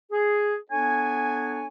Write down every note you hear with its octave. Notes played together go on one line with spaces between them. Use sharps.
G#4
B3 D4 A4 C#5 G#5